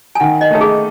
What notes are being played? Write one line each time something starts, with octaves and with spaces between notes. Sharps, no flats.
G#5
D#3 F#5
D#5
A3 D#4 A4
G#4